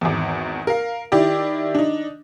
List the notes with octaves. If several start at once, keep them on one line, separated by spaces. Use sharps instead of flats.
G#1 E2
A#4 F5
D#3 E4 G4 D5
D4 D#4